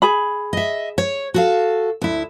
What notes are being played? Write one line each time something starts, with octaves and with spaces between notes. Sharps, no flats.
G#4 B5
D#5 E5
C#5
F#4 A4 F5
D2 E4